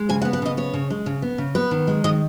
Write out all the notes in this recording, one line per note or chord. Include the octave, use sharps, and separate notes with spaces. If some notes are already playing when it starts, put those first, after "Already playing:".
Already playing: G#3
C#3 G#5
F#5
B3
F#5
C#3 D#5
B3 C#5
C#3
G#3
C#3
B3
C#3
B3 B4
D#3
G#3
D#3 D#5